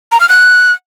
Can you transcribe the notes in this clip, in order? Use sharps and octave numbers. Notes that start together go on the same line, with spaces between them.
A#5
F6
F#6